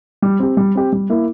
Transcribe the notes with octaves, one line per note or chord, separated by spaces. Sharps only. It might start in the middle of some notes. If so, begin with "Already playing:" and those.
G3
C4 G4
G3
C4 G4
G3
A#3 E4